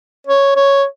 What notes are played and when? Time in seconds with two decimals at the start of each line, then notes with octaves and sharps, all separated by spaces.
0.27 C#5
0.55 C#5